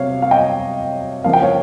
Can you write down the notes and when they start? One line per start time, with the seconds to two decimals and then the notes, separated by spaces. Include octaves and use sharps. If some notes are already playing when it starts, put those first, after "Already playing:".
Already playing: C3 C4 C#5 F5
0.22 F5
0.31 D#5 G5
1.24 C#3 F3 A#3 F5
1.33 G5
1.42 C#5 F5